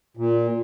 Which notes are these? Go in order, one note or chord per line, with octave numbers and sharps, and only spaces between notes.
A#2